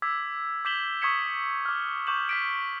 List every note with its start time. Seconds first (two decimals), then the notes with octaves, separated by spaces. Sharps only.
0.02 D6 E6 G#6 B6
0.65 D6 G6 B6 E7 F#7 G7
1.01 C#6 D#6 G#6 B6 C#7 E7
1.65 D6 F6
2.07 C#6 D6 G6 E7 F#7
2.29 F6 B6 D7